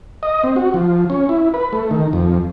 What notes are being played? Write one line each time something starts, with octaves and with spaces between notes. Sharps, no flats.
D#5
C4
F#4
F3
C#4
E4
B4
A3
D#3
F2